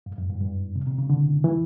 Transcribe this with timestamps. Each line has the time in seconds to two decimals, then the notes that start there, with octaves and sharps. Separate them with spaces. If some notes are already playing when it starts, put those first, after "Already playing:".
0.06 G2
0.18 F#2
0.30 G2
0.41 G2
0.76 C3
0.87 C3
0.98 C#3
1.10 D3
1.44 E3